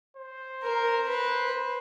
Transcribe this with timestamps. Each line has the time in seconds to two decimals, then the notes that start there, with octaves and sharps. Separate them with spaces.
0.17 C5
0.63 A#4
1.08 B4